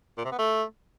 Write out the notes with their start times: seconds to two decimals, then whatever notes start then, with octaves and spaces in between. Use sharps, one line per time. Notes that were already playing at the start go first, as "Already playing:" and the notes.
0.17 A#2
0.24 C3
0.31 B3
0.39 A3